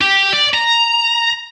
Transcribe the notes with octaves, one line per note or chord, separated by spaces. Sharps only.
G4
D5
A#5